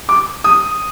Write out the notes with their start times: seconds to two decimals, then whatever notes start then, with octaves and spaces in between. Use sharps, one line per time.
0.09 D6
0.44 D#6